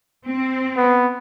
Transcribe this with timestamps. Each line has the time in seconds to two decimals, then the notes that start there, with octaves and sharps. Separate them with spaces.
0.24 C4
0.77 B3